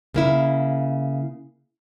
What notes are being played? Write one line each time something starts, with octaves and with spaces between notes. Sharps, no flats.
C#3 A#3 E4